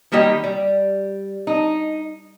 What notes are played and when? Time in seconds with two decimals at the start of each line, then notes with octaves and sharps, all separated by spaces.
0.12 D#3 G3 A#3 G4 D#5
0.44 G3
1.47 D#4